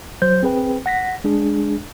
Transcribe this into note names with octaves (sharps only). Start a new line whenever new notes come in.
F#3 C5 G6
C4 G#4 B4 G5
F#5 A#6 B6
G#3 D4 G#4